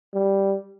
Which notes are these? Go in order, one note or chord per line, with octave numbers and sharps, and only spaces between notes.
G3